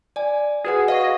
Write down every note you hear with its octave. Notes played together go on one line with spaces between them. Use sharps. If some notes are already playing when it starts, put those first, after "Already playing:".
D5 G#5
F#4 G#4 B4 F#5
D#5 F5 C#6